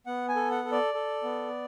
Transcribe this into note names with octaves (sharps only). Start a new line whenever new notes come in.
B3 F#5
G#5
A4
F#5
A4
D5
A4
B3